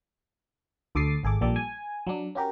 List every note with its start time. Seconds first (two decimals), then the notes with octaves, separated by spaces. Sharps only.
0.95 D2 A4 D6 D#6 A6 C7
1.23 G#1 G#4 A4 D6
1.41 A#1 A#2 G3 A4 D5 D6
1.56 G#5
2.07 F#3 D4
2.35 C#4 F#4 G4 A#4